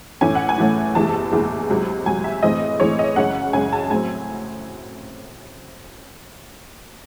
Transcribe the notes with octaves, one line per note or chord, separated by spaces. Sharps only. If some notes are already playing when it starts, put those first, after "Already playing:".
A2 E3 A3 C#4 G#5
F#5
G#5
A2 E3 A3 C#4
F#1 E2 C3 E3 G#3 A5
F#1 E2 C3 E3 G#3
C#2 C3 F#3
C#2 C3 F#3 G#5
E5
A2 E3 G#3 C4 D#5
A2 E3 G#3 C4 C#5
D#5
F#2 C#3 G#3 C#4 F#5
F#2 C#3 G#3 C#4 G#5
A5
A2 F#3 C4 G#5